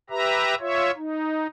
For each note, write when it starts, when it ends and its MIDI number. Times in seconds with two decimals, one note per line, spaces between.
0.10 0.55 67
0.10 0.55 71
0.10 0.55 76
0.10 0.55 82
0.60 0.91 65
0.60 0.91 73
0.60 0.91 76
0.97 1.47 63